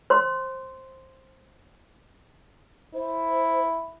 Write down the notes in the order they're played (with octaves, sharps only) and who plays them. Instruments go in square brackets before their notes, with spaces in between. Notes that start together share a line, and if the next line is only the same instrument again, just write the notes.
[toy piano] C5 C6
[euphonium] E4 [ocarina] C5